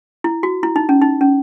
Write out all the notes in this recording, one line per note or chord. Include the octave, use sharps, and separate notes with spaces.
E4
F#4
E4
D#4
C#4
D#4
C#4